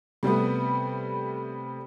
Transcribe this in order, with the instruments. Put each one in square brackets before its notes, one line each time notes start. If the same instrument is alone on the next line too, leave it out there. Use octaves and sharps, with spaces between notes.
[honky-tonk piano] C3 G3 A3 B3